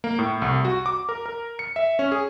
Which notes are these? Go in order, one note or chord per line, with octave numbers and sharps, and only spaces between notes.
A#3
A2
C2
F#4
D6
A#4
A#4
C#7
E5
C#4
G#4